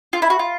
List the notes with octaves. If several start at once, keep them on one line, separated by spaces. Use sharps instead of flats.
F4
E4
F#4
F4